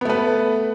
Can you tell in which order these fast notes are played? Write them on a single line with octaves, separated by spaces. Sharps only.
B3 A3 B4